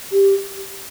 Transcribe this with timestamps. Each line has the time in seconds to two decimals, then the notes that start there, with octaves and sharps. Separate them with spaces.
0.12 G4